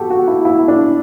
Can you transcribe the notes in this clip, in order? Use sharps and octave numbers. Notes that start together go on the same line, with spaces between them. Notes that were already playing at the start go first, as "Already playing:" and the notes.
Already playing: F#4 G4 A4
F#4
E4
E4
D4